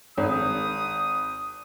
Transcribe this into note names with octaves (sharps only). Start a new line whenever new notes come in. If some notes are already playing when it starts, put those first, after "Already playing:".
G#1 D#6